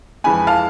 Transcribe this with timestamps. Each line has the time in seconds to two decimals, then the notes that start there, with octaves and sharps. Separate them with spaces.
0.24 F2 E3 G#3 G#5 B5
0.47 F5 A5